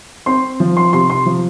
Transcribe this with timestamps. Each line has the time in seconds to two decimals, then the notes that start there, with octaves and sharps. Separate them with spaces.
0.26 C4 C6
0.60 F3
0.77 C6
0.93 C3 C6
1.10 C6
1.26 F3